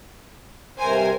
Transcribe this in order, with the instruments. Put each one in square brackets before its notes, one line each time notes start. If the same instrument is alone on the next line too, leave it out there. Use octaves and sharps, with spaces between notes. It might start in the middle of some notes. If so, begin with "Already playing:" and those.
[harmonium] G2 C3 [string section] A#4 C5 G#5